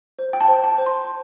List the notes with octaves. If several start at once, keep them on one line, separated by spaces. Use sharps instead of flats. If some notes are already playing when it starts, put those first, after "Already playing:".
C5
G5
A5
C5
A5
C5
C6